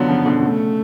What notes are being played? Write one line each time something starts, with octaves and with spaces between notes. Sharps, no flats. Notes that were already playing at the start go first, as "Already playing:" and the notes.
Already playing: D3 F#3 B3 C#4 F4
C#3 F3
B2 D3
C#3 A3